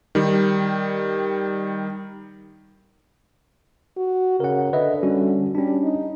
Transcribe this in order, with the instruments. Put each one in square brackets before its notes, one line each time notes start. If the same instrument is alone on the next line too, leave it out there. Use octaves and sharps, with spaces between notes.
[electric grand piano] D#3 G3
[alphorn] F#4
[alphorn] C#3 [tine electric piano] A#4 F#5
[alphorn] D3 [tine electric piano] B4 D#5 E5
[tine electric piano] G3 C#4 F#4
[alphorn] G3 [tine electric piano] C#4 D4
[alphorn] D#4